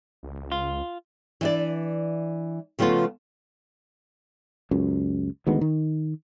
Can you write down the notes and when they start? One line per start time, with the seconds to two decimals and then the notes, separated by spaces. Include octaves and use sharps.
0.23 C#2
0.52 F4
1.41 E3 D4 D5
2.79 C#3 F3 A3 B3 F4
4.71 C#2 F#2
5.47 D2 D#3 G#3 B3
5.61 D#3